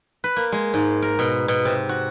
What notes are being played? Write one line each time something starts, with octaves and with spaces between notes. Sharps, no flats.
B4
A#3
G#3
G#2
A#4
B2
B2
C3
F#4